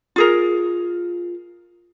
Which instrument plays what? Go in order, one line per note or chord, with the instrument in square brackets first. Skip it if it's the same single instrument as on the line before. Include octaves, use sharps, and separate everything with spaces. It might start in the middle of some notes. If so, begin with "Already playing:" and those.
[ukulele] F4 G#4 A#4